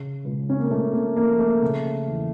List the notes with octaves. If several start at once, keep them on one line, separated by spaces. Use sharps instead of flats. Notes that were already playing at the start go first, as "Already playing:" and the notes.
Already playing: C#3
C#2
C#4
A#3
C#2 A3
A#3
F3 A#3
A3
C#3
E2